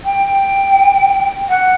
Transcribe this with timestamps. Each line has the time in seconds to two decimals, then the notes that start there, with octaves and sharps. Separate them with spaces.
0.05 G5
1.49 F#5